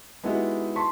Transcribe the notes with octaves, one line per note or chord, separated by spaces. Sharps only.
G#3 B3 D#4 E4 F#4 G4
A5 C6 C#6 B6